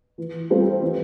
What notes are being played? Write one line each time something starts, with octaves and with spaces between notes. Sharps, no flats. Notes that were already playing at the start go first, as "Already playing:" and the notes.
E3
G3 C4 F4 A4
E3